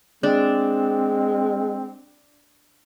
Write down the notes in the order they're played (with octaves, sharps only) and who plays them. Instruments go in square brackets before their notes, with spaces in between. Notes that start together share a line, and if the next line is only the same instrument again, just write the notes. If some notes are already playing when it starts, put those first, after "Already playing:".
[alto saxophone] G#3 [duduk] C4 [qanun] D4